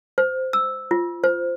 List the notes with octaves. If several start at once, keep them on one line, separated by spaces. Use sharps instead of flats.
C5
E6
F4
C5